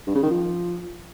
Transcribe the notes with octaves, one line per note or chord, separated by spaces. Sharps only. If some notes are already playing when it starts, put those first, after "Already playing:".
G2
C#3
D#3
F3